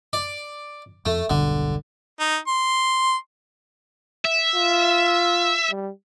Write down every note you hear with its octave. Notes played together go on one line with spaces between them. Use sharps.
D5
F2 A3
E1 B1 G2 D3
D#4
C6
E5
F4
G3